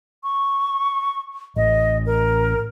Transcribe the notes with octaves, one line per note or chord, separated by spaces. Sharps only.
C#6
A1 D#5
A#4